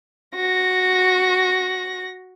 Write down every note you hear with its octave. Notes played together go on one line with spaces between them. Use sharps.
F#4 A#6